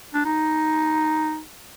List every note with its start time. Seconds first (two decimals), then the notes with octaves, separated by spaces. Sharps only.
0.14 D4
0.25 D#4